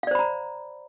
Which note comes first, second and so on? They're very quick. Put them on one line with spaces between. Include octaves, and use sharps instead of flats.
F5 D5 C5 B5 A#5